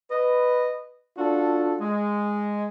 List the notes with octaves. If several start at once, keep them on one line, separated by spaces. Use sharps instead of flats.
B4 D#5
D4 F4 F#4 A4
G#3